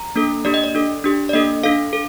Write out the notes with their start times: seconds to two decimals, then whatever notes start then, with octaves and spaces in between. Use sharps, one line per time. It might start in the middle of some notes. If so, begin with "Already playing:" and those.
Already playing: A#5
0.16 A#3 D4 A4
0.45 A#3 D4 G4 D5
0.54 D#5
0.64 D5
0.75 D4 A4
1.04 D4 G4
1.29 D5
1.33 A#3 D4 A4 D#5
1.63 D4 A4 F5
1.93 A4